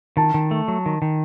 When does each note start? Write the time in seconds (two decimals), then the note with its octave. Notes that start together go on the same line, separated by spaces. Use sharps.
0.17 D#3 A5
0.34 D#3
0.51 A3
0.68 F#3
0.86 D#3
1.02 D#3